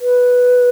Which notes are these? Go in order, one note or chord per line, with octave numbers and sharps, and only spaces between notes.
B4